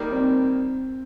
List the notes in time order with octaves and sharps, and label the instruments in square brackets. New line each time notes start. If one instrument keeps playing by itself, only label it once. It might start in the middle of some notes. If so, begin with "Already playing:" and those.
Already playing: [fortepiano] D#3 G3 A#3
[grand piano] C4